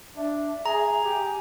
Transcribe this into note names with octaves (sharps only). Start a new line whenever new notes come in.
D4 E5
G#4 A#5
G4 G#5